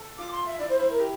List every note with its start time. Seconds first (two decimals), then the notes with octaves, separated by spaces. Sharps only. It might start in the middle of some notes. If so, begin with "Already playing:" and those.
Already playing: A4
0.18 F4 D6
0.32 C6
0.46 E5
0.59 E4 D5
0.69 C5
0.79 E4 C5
0.90 A#4
1.00 G4